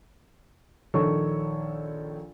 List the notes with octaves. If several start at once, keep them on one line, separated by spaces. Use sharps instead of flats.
A#1 D#3 A4 C#5 C#6